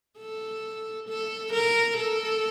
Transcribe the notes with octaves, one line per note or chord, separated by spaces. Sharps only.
A4
A4
A#4
A4